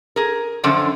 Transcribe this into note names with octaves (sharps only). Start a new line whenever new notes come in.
G#4 A#4
F#2 D3 F3 C#4 C5 D5